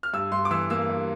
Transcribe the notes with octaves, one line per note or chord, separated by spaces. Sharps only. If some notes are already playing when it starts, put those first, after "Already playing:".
F6
G2 E6
G2 C6
D6
E3 E6
A#3 E6
G2